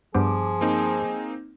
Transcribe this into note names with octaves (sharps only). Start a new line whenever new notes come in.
G2 F3 B3 G#4 C5 D6
A#3 C4 D#4